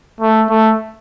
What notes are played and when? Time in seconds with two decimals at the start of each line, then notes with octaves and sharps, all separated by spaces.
0.21 A3
0.50 A3